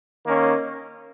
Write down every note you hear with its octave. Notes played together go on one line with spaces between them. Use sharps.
D#3 A#3 C#4